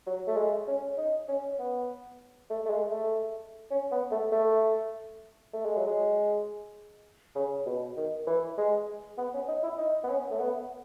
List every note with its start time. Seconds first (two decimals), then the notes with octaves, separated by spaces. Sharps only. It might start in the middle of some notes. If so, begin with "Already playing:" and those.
0.07 F#3
0.28 A3
0.37 G#3
0.67 C#4
0.98 D#4
1.29 C#4
1.59 B3
2.50 A3
2.66 A3
2.70 G#3
2.91 A3
3.71 C#4
3.92 B3
4.12 A3
4.32 A3
5.54 A3
5.65 G#3
5.77 F#3
5.87 G#3
7.35 C#3
7.66 B2
7.97 D#3
8.27 E3
8.58 G#3
9.18 B3
9.34 C#4
9.48 D#4
9.63 E4
9.78 D#4
10.04 B3
10.09 C#4
10.31 A3
10.40 B3